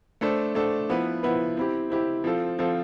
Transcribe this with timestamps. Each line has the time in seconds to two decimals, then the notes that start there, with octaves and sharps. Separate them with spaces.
0.21 A3 D4 A4 C5
0.55 A3 D4 A4 C5
0.89 F3 B3 E4 B4
1.23 F3 B3 E4 B4
1.57 C4 E4 G4
1.90 C4 E4 G4
2.24 F3 C4 F4 A4
2.59 F3 C4 F4 A4